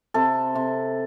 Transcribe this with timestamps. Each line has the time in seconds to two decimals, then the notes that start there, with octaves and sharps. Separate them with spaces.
0.14 C3 A4
0.55 C3